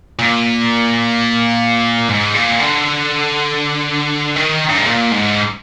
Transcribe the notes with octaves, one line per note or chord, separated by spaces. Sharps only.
A#2
G#2
A#2
D3
D#3
G2
G#2
A#2
G#2